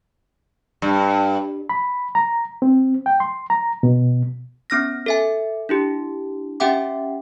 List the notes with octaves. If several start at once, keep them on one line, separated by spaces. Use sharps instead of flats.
G2
B5
A#5
C4
G5
C6
A#5
B2
B3 C#4 F6 A#6
A4 E5 G#5
D4 E4 G4
C#4 G4 E5 F#5 G5 D6